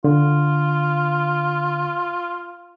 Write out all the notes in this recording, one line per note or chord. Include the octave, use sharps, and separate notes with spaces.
D3 F4